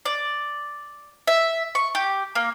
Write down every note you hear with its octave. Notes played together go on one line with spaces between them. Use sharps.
D5
E5
C#6
G4
A#3